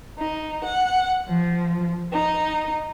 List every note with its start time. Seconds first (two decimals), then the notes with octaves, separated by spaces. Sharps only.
0.18 D#4
0.64 F#5
1.28 F3
2.12 D#4